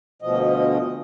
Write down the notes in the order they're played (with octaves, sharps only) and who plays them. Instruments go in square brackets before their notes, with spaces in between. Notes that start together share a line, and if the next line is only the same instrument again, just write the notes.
[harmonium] D2 B2 F3 D#5